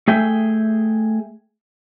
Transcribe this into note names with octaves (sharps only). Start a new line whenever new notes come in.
A3 G#4 E5 G5